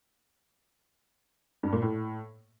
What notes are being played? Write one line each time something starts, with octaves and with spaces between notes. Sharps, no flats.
G2
A#2
A2